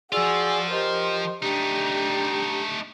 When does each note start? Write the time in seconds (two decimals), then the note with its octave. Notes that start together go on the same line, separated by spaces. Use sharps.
0.12 F3 F4 F#4 G#4 D5 G#5 E6
0.71 G4 A#4 C5 D#5 C6
1.42 A3 D4 D#4 G4 A#5